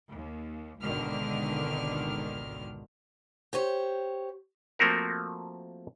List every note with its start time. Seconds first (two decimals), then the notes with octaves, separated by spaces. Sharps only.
0.11 D#2
0.81 G#1 C#2 B2 D3 D#3 F6
3.53 G4 C5 C#5
4.79 F3 A3 A#3 C4 F#4 A#4